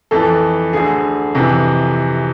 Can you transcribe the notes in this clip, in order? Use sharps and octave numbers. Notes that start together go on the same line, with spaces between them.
F2 E3 A4
D2 D3 G#4
F2 C3 E3